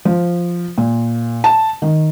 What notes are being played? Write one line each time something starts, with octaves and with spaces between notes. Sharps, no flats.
F3
A#2
A5
D#3